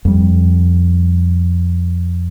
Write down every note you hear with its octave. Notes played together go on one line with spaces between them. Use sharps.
F2 G3